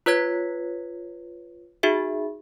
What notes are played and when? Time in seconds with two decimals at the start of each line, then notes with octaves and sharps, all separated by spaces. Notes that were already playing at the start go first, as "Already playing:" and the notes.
0.06 F4 B4 C#5 G#6 B6
1.83 D#4 F#4 G#4 E5